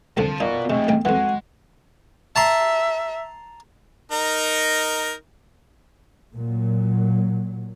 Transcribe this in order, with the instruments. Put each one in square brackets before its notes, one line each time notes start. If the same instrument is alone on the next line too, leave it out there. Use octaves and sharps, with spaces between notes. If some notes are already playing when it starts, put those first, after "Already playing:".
[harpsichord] C2 F2 D3 [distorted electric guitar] F5 A5
[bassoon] A#2 [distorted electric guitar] B3 F#4 [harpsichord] D#4
[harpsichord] C3 [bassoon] G#3 [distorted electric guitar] A3 C4
[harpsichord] A1 G5
[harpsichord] F2 E3 [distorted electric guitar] G#3 [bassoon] F#4
[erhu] E5 [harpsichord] A5 A#5 C6
[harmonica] D#4 A#4
[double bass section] A#2 F#3